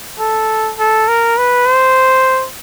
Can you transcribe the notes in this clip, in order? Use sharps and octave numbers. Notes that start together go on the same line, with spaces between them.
A4
A4
A#4
B4
C5